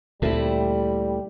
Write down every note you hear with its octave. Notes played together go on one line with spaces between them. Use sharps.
D2 A#2 G3 A3 C4 E4